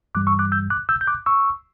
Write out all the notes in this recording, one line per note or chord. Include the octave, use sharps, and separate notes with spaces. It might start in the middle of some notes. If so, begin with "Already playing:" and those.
G2 E3 G3 D6 F#6
C#6 E6
D6 F#6
E6 G6
D6 F#6
E6 G6
G6
D6 F#6
C#6 E6